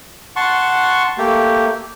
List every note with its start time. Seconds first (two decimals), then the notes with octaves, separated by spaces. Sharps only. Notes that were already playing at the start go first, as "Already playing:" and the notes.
0.36 F#5 A5 C6 C#6
1.18 A3 A#3 G4